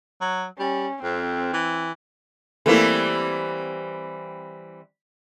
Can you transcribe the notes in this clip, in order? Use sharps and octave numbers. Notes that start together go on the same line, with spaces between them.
F#3
G3 C#4
F2 C4
E3
E3 G3 A3 A#3 C4 E4